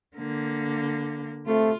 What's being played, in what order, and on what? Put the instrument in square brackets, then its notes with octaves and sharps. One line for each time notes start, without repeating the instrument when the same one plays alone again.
[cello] D3 A#3
[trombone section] C3 A3 [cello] F4